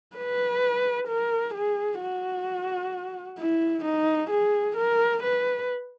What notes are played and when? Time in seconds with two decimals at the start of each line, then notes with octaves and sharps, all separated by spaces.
0.16 B4
1.08 A#4
1.54 G#4
2.00 F#4
3.38 E4
3.85 D#4
4.30 G#4
4.77 A#4
5.23 B4